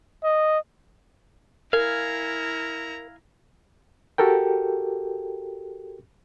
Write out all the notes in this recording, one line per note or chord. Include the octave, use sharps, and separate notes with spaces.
D#5
E4 A#4 F5 G#5 A#5
F#4 G4 A4 A#4 G5